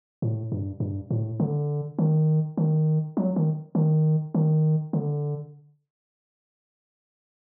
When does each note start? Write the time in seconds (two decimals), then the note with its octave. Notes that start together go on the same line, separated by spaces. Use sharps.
0.22 A2
0.52 G2
0.80 G2
1.10 A2
1.40 D3
1.98 D#3
2.57 D#3
3.17 F#3
3.36 D#3
3.75 D#3
4.34 D#3
4.93 D3